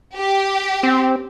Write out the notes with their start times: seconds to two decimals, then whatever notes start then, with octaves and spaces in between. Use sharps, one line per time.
0.17 G4
0.83 C4